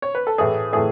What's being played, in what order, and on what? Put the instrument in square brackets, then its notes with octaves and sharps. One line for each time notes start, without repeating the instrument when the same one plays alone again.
[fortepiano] C#5
B4
A4
A2 E3 A3 G#4
A2 E3 A3 G#4